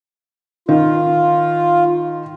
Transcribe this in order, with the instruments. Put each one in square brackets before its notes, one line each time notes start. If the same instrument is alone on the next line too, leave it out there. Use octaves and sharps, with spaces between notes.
[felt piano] D#3 [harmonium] F4